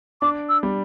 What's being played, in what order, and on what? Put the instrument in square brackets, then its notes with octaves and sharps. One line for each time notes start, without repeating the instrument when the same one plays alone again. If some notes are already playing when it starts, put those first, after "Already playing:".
[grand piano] D4 [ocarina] D6
[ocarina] E6
[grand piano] G3